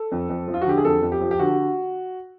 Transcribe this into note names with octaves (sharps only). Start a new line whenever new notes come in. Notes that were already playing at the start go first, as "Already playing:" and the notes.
Already playing: A4
F2
F2
F3
F4
F#4
D3 G4
G#4
F2 A4
F2
G4
F3
G4
D3 F#4